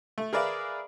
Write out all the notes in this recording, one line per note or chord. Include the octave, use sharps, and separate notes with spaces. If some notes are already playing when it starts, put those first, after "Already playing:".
A3
G#4 A#4 B4 D5 E5 F5